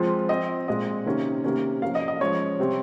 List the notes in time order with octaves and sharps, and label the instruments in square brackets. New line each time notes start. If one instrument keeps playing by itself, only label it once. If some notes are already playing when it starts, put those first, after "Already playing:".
Already playing: [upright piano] F3 G#3 C4 F4
F3 C4 D#5
A#2 G#3 C4 D#5
C3 D#3 A#3 C#4
C3 D#3 A#3 C#4
F3 A#3 C#4 F5
D#5
D#5
F3 G#3 C#4 C#5
C3 G3 C4